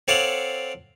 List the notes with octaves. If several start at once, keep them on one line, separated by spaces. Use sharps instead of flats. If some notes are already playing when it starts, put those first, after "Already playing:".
C4 A4 C#5 D5 F5 F#5